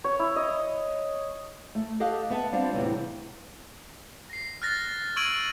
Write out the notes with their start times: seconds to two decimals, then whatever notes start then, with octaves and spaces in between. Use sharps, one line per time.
0.04 C#5
0.19 E4
0.36 D#5
1.75 A3
2.00 G4 A4 D#5 F5 F#5
2.30 B3 E5 A5
2.52 G3 C4 D4 F4 G4
2.74 E2 A2 C3 E3
4.30 A#6 C7
4.62 F6 F#6 A6 A#6
5.16 C#6 E6 G#6 D7 D#7 F#7